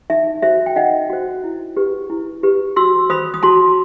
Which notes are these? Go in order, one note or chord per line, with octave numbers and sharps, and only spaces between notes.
D#4 E5
F#4 C5 E5
G5
D#4 D#5 F#5
F#4 C5
E4
G4 B4
E4
G4 B4
F#4 C6 E6
C5 B5 D#6
D#6
F#4 A5 C6